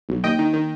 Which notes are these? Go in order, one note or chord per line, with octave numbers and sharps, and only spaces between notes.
B1
D#2 D#5 G5
D#3
D#3